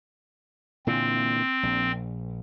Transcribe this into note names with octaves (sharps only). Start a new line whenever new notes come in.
A#2 D3 E3 C4
A#1